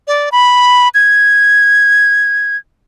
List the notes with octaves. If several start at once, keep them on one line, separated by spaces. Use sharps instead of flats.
D5
B5
G#6